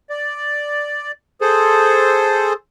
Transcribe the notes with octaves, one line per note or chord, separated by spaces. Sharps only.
D5
G#4 A4 C5